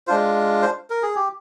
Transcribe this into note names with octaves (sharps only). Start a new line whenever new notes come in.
G#3 D4 F4 C5
C5
A#4
G#4
G4